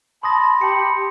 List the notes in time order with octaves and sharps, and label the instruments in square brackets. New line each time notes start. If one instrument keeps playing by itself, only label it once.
[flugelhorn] A5 [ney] B5 [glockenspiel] C6 D#6 A#6
[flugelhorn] G4 [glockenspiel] A5 A#5 C#7